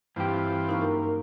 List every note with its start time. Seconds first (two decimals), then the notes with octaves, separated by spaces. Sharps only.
0.16 G2 E3 C4 F4 G4
0.69 F#2 A#3 D#4 A#4 F5 C#6